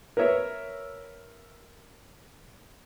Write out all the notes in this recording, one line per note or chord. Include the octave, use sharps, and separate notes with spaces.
A#4 B4 C#5 E5